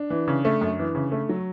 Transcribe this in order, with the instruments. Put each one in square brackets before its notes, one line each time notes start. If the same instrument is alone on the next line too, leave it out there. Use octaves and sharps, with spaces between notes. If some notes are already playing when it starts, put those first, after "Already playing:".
Already playing: [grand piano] D4
[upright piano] E3
C#3
A3
F#2
E3
C#3
A3
[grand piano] F#3